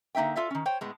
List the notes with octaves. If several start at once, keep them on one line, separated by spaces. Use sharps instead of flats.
D3 A#3 D#4 E5 G5
F4 A4 D5 E5
D#3 C#4
C5 C#5 G5
A2 G#3 B3